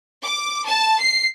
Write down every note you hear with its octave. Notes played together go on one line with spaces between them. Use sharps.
D6
A5
C7